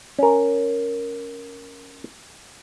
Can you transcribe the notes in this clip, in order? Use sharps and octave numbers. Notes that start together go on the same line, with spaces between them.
C#4 A#4